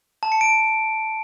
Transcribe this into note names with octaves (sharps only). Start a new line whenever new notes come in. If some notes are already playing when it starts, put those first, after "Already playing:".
A5
C#7
D7